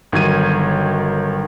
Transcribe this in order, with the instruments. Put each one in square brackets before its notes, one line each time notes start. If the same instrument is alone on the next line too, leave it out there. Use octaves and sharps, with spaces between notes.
[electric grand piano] G1 D#3 F#3 G#6 D#7